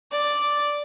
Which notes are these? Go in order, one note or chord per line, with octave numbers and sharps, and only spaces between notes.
D5